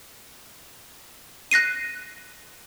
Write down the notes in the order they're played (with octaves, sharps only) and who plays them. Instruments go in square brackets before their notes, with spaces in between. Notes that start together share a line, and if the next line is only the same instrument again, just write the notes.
[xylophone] F#6 A#6 C7 D#7